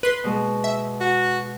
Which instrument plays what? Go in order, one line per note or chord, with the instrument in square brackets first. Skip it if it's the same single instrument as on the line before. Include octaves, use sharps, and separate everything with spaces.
[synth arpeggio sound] B4 C6
[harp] B2 G#3
[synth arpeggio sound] E5
[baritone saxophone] F#4